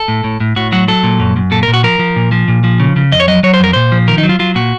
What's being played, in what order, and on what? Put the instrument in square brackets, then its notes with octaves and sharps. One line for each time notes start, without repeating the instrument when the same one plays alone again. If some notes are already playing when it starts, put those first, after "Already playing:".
Already playing: [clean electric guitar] A4
A2
A2
A2
A2 F#4
F#3 F#4
F#3 A4
A#2
F#2
F#2
A#2 A4
A#4
A#2
F#4
F3 A#4
F3
A#2
F3
A#2
F3
C#3
C#3
F2 D#5
C#5
F#3 D#5
F#3 C#5
C5
F2 A#4
A#2 C5
F3
D#3 A#4
D#4
F#3
F4
F#3 F4
A#2 F#4